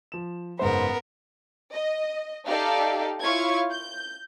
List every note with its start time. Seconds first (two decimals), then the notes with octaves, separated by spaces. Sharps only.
0.12 F3 E7
0.59 F#1 G#2 B3 A#4 C5
1.73 D#5
2.46 D#4 G4 A4 D5 E5 F5
3.22 E4 F4 C#5 F5 C#6 G#6
3.72 G6